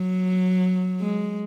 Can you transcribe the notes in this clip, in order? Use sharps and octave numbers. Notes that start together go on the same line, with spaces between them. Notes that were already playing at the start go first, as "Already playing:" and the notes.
Already playing: F#3
G#3